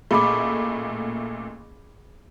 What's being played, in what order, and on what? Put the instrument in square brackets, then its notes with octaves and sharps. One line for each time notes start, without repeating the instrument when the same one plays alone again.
[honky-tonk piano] A1 A#2 A3 [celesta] G#4 B5 D6